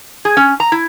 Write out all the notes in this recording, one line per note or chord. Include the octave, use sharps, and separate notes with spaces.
G#4
C#4
A#5
E4